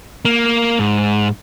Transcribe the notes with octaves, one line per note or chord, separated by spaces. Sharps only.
A#3
G#2